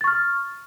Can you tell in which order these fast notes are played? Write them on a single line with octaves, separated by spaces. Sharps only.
A6 C#6 F6